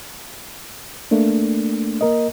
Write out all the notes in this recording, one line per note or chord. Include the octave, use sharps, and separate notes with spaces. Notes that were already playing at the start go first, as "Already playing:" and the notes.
A3 A#3 D4
A#3 A#4 D#5